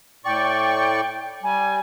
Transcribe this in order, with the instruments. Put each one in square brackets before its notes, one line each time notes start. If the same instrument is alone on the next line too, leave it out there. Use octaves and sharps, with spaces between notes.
[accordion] A2 D5 C#6 [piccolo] G5
[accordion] G3 [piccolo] G#5